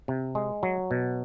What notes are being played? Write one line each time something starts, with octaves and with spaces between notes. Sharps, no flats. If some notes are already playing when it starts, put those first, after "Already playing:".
C3
G#3
F#3
B2